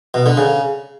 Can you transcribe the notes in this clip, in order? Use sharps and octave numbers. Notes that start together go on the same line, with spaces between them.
B2
D3
C#3